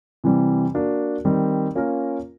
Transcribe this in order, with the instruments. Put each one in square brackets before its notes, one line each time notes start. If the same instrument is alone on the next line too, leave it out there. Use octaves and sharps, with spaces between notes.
[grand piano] C3 E3 G3 C4
A#3 D4 F#4
D#3 G3 C4
A#3 C#4 F4 A#4